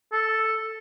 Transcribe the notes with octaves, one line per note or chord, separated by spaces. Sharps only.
A4